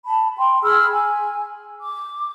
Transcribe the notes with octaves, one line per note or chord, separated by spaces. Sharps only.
A5 B5
G5 C6
G#4 B5 E6 F6
G#5
D6